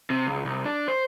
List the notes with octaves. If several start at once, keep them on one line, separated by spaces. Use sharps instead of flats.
C3
C#2
C2
D4
C5